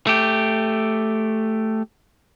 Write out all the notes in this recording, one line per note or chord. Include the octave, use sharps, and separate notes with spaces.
A3 G4